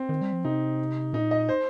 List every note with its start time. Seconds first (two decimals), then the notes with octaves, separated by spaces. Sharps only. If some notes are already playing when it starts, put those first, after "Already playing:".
Already playing: C4
0.09 D#3
0.22 G3
0.33 F3
0.45 C3 D#4
1.13 A#2 D#4
1.31 D#5
1.49 C5